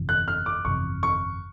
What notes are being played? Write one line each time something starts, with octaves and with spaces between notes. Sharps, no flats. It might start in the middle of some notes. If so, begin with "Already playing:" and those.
Already playing: G1 F2 C3 E3
F#6
F6
D6
G1 F2 C3 E3 C#6
C#6